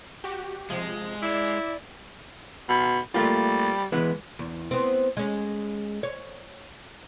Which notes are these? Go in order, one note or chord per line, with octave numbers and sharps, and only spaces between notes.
F#4 G4
C3 F3 G#3
E4 D5 D6 E7
B2
G3 A3 A#3 F4
E3 G#3 B3
E2
B3 C4
G#3 C#4
C#5